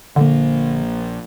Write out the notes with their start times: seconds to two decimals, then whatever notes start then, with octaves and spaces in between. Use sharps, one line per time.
0.16 A#1 D3 A#3